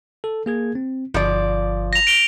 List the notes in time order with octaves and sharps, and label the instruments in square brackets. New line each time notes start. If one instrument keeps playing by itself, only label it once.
[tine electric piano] A4
A#3 G#4 G#6
C4
[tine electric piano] G1 [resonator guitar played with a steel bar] F3 D5
[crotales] A#6 F7
D7 F7 G7